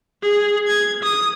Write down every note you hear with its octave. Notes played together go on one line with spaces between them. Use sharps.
G#4
G#6
D#6